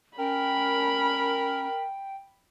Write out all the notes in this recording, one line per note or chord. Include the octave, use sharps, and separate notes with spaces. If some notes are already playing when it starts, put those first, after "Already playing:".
C#4 A#4 G5 B5